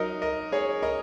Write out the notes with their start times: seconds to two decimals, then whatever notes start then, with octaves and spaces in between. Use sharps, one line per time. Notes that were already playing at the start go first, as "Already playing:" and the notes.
Already playing: F#3 D#4 A#4 D#5
0.22 A#4 D#5
0.52 G#4 C#5
0.83 A#4 D#5